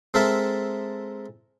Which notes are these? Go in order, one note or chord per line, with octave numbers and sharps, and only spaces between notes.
G#3 C4 A4 A#4 E5